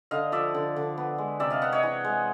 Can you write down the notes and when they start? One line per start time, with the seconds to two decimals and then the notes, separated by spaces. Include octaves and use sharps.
0.11 D3 D#5 F5
0.32 F3 D5 E5
0.55 D3
0.76 D3
0.98 B3
1.18 G#3
1.40 C3 D5 E5
1.50 D#5 F5
1.61 B3 E5 F#5
1.72 C#5 D#5
1.83 E3
2.04 G#3